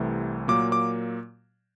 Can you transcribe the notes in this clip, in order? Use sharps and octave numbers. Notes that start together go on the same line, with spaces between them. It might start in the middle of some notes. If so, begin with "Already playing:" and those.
Already playing: C2 C3 E3 A3
A#2 F#3 A#3 D6
D6